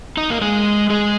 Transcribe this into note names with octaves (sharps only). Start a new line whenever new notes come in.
D#4 D#5
A#3 A#4
G#3 G#4
G#3 G#4